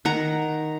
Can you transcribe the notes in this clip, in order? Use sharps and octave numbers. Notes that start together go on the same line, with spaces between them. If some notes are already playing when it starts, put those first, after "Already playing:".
D#3 F#5 A#5